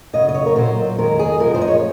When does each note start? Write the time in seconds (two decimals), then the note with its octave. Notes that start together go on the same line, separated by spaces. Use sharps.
0.13 F#2 C#3 F#3 D#5
0.29 D#5
0.34 C#5
0.46 A#4
0.55 A#2 F#3 C5
0.98 F2 D#3 G#3 A#4
1.19 G#4
1.39 F#2 F3 G#3 A#4
1.55 C5
1.62 D#5
1.68 C#5